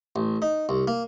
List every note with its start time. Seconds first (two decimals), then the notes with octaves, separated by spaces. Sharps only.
0.16 A1
0.42 D#4
0.69 C2
0.88 A#3